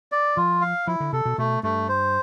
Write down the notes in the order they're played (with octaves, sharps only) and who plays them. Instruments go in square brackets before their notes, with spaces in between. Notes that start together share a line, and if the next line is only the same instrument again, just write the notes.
[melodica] D5
[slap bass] F3 [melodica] F4
[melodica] F5
[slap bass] F3 [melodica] E4
[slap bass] D3
[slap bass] C3 [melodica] A4
[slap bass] B2
[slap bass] B2 [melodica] A3
[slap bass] G2 [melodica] A3
[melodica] C5